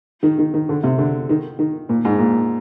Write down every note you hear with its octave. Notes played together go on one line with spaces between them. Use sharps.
D#3
D#3
D#3
D3
C3
D3
D#3
D#3
A#2
G#2
A#2